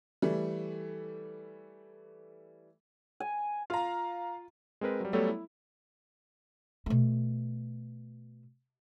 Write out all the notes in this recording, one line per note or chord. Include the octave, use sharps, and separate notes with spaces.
E3 G3 A3
G#5
F4 F5 A#5
G#3 C4 A#4 B4
F#3 G3
F#3 G3 A3 B3 A4 C#5
E4
B2 A3